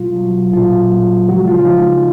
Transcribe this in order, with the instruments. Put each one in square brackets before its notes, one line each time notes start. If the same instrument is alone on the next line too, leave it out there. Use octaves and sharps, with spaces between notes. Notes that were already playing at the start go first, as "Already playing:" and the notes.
Already playing: [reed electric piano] B2 F#3 F4
B2 F#3
A#2 F#3 F4
A#2 F#3
C#3 F3 G#3 F#4
F4
F4
C#3 F3 G#3 D#4